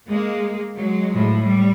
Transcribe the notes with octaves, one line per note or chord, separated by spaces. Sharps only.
G#3 A#3
F#3 G#3
A2 F3
G3